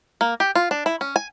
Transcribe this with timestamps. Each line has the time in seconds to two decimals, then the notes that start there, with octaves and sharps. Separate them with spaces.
0.21 A#3
0.40 G4
0.55 F4
0.71 D4
0.86 E4
1.01 C#4
1.16 G#5